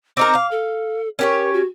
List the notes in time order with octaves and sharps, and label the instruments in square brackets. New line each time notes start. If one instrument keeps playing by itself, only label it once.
[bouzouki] C4 D#4 A#4 [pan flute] D6
[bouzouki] F5
[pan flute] A4
[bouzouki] C#4 G4 C#5 [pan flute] A#4
[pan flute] F#4